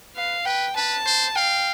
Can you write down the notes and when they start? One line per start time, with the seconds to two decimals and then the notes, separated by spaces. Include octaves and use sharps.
0.16 B4 F5
0.46 B4 G5
0.76 B4 A5
1.06 C5
1.36 F5 G5